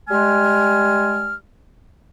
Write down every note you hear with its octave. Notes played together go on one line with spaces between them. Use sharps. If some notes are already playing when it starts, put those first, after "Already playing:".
G3 G#3 G#5 F6